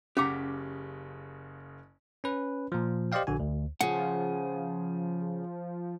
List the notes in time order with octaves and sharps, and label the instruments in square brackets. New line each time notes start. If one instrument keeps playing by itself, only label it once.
[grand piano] F#1 C#3 B6 [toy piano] C#4 D6 [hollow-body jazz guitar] G4 F#5 A#5
[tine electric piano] C#4 B4
A#2 F3
G4 C5 D5 D#5 F5 G5
A#1 D3 F#4 G#5
D2
[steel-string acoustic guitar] C#3 [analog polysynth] F3 [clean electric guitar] G#4 F#5